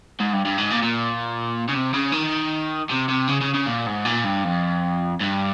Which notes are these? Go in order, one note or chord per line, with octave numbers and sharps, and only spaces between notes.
G#2
G2
G2
G#2
A#2
A#2
C#3
C3
C#3
D#3
C3
C3
C#3
C#3
C#3
A#2
G#2
A#2
G2
F2
G2